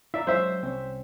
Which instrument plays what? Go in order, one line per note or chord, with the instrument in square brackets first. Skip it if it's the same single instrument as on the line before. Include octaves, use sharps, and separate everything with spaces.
[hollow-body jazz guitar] E4 D5 A#5 [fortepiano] E5
[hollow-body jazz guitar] F#3 G#3 C#4 [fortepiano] C5 E5
[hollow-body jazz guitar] C2 C4 C#4